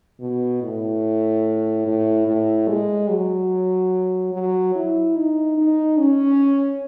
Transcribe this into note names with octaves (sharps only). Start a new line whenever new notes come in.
B2
A2
A2
A2
G#3
F#3
F#3
E4
D#4
D#4
C#4